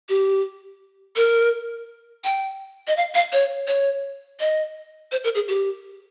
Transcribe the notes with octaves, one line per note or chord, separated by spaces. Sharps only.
G4
A#4
G5
D#5
F5
F5
C#5
C#5
D#5
C5
A#4
G#4
G4